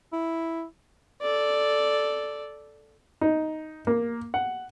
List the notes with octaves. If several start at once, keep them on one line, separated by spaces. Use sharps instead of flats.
E4
A4 D5
D#4
A#3
F#5